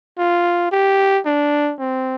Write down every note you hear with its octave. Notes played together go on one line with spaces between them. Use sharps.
F4
G4
D4
C4